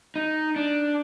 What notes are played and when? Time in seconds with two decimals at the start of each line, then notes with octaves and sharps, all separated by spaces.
0.16 D#4
0.56 D4